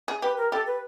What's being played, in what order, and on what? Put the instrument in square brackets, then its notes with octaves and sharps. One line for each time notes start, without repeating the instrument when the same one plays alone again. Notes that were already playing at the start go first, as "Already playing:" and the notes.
[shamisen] G#4
[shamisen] G4 [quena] B4
[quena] A#4
[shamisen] G4 [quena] A4
[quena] B4